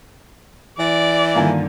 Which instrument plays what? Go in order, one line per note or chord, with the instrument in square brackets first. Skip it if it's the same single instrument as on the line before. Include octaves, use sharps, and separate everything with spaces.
[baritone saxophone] E3 [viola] D5
[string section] G2 D3 D#3 [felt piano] A#3 F4 G#5